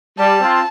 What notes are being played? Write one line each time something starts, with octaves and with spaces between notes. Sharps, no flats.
G3 A5
C4 F4